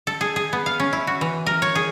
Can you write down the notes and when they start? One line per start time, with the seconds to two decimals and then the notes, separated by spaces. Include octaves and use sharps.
0.07 A4
0.21 G#4
0.36 G#4
0.53 B3
0.66 F5
0.80 C#4
0.93 E4
1.07 F#4
1.21 E3
1.46 A#4
1.62 C#5
1.75 G#4